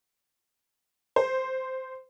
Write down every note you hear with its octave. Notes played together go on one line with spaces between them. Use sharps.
C5